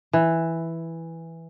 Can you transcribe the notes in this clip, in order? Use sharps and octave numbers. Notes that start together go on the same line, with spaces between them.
E3